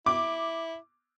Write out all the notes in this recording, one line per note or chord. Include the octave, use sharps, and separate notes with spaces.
E4 D6